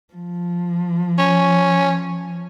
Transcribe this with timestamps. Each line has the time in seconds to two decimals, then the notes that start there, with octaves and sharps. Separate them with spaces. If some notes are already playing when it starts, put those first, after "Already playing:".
0.14 F3
1.18 C#4